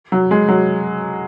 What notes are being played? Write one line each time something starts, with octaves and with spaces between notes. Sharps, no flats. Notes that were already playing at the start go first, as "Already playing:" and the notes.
F#3
G#3
F#3